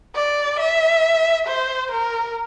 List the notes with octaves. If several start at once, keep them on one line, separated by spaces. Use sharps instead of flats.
D5
E5
C5
A#4